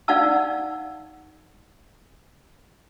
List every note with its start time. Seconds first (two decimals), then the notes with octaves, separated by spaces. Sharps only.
0.08 D#4 D5 F5 F#5 A5 E6